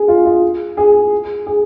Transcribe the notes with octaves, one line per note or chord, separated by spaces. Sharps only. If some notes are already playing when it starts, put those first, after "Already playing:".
Already playing: G#4
F4
F4
G#4
G#4